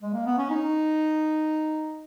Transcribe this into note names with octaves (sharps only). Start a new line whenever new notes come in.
G#3
A#3
B3
C#4
D#4